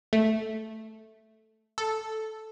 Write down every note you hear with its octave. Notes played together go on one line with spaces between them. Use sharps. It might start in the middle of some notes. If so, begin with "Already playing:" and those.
A3
A4